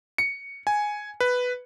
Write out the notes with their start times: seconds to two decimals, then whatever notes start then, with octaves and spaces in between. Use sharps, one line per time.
0.18 C#7
0.67 G#5
1.20 B4